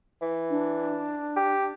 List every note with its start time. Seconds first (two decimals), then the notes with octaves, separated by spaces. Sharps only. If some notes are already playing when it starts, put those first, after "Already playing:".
0.22 E3
0.50 D4
1.36 G4